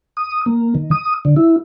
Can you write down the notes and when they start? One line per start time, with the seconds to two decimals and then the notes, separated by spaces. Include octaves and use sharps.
0.17 D#6
0.46 A#3
0.75 D#3
0.91 D#6
1.25 D3
1.36 E4